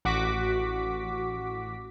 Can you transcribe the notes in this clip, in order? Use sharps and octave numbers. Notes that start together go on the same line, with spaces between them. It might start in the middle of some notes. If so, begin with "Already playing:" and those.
A1 F#4 D6 B6